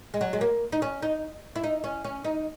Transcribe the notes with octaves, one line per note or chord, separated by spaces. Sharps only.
G#3
F#3
G#3
A#3
D#4
C#4
D#4
E4
D#4
C#4
C#4
D#4